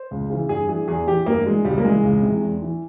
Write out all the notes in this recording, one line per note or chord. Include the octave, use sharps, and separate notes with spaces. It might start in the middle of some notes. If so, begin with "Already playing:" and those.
Already playing: C5
C#2
C#3 E3
G2 G#4
E3 G#4
E2 G#4
E3 G4
G2 A#3
E3 G#3
C#2 G3
A#3
C#3 E3 G#3
C#2
C3
E3
E2
E3